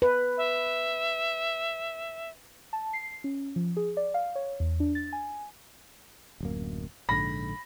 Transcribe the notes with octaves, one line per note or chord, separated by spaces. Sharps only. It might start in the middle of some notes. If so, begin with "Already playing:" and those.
B4
E5
A5
C7
C#4
F3
G#4
D5
F5
C#5
E2
D4
A6
G#5
D1 F#2 A#3
A#1 G#2 D3 B5 A#6